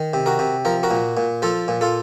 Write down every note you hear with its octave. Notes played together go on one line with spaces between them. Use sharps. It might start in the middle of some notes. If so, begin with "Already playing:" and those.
Already playing: D#3
C3
F#4 A#4
C3
F3 A#4
F#4 A#4
A#2
A#2
F3 F4 A4
A#2
F4 A4